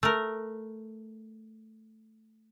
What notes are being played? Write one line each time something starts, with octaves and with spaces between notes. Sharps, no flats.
A3 A#4